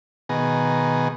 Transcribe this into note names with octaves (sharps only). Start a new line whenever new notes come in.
B2 D#3 B3 G#4 A#5